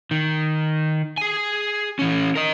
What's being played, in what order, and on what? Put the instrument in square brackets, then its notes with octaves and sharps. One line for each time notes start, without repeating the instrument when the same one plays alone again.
[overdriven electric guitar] D#3
G#4 G#5
E3 C#4
A#4 D#5